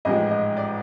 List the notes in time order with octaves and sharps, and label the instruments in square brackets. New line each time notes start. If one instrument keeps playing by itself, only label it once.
[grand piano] A1 G#2 F3 G#3 D#5
D#5
D5